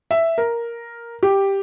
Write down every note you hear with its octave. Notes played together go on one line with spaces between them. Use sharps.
E5
A#4
G4